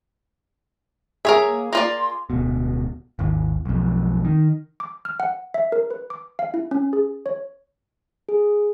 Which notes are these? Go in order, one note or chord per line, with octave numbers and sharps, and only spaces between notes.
G#4 A#4 C#5 E5
A#3
A#3 F4 D5 C6
D1 B2
G#1 D#2
B1 F2
D#3
D6
F6
F#5
E5
A#4
B4
D6
F5
E4
C#4
G#4
C#5
G#4